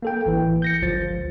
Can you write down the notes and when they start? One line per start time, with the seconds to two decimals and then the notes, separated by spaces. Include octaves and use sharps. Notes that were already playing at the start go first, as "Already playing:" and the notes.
0.02 A#3 A4 G5
0.26 A1 E3
0.62 G6 A#6 C#7
0.82 G1 C#2 F3 A6